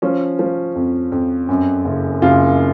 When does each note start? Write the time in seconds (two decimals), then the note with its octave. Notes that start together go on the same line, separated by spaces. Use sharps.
0.02 F3 C#4
0.39 F3
0.76 F2
1.12 F2
1.49 F#2
1.85 F#1
2.22 F#1 F4